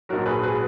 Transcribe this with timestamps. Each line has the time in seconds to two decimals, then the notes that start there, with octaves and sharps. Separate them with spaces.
0.09 A#1 G#2 F#3 F#4 A#4
0.26 G#4 B4
0.43 G#4 B4